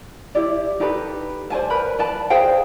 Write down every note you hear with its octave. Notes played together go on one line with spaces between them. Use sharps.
E4 G4 D5
D#4 G4 A4 B4
C5 D5 G#5 A5
A#4 B4 B5
B4 D5 A5
G#4 C5 F5 G5